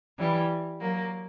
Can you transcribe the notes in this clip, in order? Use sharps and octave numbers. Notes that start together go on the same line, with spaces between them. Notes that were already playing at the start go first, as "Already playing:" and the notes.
E3 G3
F#3 A#3